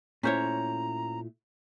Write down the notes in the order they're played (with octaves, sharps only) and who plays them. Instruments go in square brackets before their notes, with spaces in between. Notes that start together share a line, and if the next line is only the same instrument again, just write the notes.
[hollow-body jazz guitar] A#2 A3 E4 [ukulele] C#4 C5 C#5 [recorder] A#5